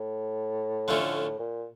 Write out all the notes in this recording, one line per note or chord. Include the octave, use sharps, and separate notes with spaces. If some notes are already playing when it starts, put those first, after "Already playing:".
Already playing: A2
D3 F3 A3 C#4
A#2